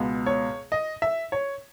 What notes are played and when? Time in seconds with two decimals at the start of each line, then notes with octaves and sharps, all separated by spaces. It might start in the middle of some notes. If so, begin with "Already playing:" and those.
Already playing: C#2 B2 G#3 B3
0.26 C#5
0.72 D#5
1.02 E5
1.32 C#5